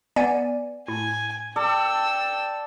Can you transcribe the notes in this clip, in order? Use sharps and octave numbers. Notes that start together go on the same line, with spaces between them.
B3 D5 G#5
A2 G#5
A4 D5 G5 E6